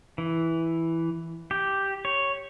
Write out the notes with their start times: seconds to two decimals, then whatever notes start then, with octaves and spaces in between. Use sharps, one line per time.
0.18 E3
1.51 G4
2.05 C#5